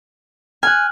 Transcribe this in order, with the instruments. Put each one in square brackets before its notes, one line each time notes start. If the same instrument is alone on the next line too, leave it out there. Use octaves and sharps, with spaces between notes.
[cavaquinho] G#5 [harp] F6 F#6